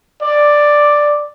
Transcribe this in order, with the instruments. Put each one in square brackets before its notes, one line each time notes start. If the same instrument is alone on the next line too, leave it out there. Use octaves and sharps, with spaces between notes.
[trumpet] D5